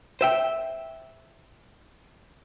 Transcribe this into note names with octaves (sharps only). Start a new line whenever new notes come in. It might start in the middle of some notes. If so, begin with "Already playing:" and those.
C5 E5 G5